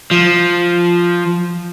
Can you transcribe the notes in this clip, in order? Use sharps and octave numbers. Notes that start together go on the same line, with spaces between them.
F3